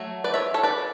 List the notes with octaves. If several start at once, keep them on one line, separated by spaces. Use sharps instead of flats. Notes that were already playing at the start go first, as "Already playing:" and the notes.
Already playing: F#3 A3
B4 D5
C#5 E5
A4 C#5
B4 D5